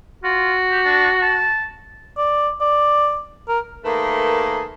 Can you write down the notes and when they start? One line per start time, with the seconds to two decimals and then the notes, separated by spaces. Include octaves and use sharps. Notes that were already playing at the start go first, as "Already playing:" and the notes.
0.24 F4 F#4
0.71 G4
0.85 D4
1.22 A5
2.17 D5
2.61 D5
3.48 A#4
3.85 D#3 A3 A#3 G#4 A4 B4